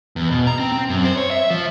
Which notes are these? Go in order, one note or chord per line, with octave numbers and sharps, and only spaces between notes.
E2
B2
A#5
C4
C4
F#2
C5
C#5
E5
F3